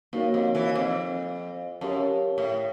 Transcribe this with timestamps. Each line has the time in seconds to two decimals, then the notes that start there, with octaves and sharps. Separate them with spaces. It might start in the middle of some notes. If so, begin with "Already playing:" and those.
0.13 G2 A#3 D#4 F#4 A#4 C#5
0.34 F2
0.55 E3
0.75 F2
1.81 F#2 G4 A#4 C#5 F5 A5
2.38 A2